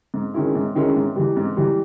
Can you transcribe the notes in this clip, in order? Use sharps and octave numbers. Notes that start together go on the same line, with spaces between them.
G#2
D#3 G#3 C#4 E4
G#2
D#3 G#3 C#4 E4
G#2
E3 G3
G#2
E3 G3